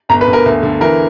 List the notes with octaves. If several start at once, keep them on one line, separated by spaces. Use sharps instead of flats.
G1 A#5
B4
G1
A#4
D2
D3
E3 A#4